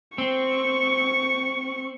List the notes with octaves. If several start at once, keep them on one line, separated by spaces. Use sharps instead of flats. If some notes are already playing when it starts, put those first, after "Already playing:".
C4 C#6